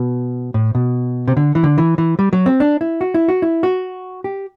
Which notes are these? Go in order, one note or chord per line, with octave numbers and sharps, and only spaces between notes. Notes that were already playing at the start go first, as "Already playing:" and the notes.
Already playing: B2
A2
B2
C3
D3
E3
D3
E3
E3
G3
F#3
C4
D4
E4
F#4
E4
F#4
E4
F#4
G4